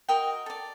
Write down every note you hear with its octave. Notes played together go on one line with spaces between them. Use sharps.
F#4 A#4 D#5 G5
A4 D5